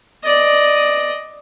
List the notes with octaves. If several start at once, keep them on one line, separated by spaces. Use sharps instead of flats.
D5 D#5